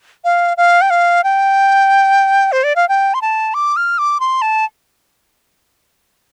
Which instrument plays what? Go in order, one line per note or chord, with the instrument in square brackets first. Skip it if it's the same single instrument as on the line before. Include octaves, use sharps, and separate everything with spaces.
[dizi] F5
F5
G5
F5
G5
C5
D5
F5
G5
C6
A5
D6
F6
D6
C6
A5